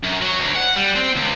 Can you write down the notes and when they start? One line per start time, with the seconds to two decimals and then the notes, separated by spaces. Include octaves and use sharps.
0.03 F#2
0.22 F#3
0.39 D2
0.56 F#5
0.76 G3
0.96 C4
1.16 C#2